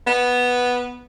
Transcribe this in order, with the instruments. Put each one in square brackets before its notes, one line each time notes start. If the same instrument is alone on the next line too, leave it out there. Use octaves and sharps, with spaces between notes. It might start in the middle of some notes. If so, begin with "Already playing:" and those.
[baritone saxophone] B3